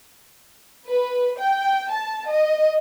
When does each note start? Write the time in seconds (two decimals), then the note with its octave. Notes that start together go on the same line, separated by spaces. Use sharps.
0.87 B4
1.38 G5
1.90 A5
2.29 D#5